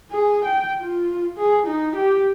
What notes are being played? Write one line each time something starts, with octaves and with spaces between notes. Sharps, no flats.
G#4
G5
F4
G#4
D#4
G4